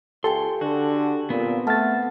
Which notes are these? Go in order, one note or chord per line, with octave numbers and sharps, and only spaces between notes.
C#2 G4 A4 G5 G#5 C6
D3 F#4
A#2 B3 C4
A3 F#5 A5 F6 A6